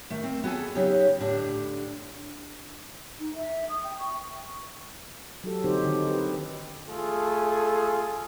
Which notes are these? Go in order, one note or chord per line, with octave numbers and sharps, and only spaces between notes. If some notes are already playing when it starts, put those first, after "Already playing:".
D#3 A3
C4
B3 F#4 G#4 A4 G#5
C#3 F#3 D#4 G4
A2 D3 D4 G4
D#4
E5
D#6
G5
C#6
F#3 F#4 G4 A4
D3 C4 D#4 G4 C5
D3 D#3 D#4
G4 B4
A3 F4 G#4 A4